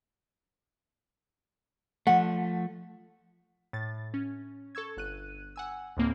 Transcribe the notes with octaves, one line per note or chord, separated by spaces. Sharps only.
F3 A3 F#5
A2 A6
C#4
A4 C#6 E6 G#6
G1 F#6 D#7
F#5 G#5 E6
D2 A2 A#3 C4